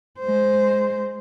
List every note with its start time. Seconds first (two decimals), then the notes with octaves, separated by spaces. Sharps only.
0.20 G#3 C5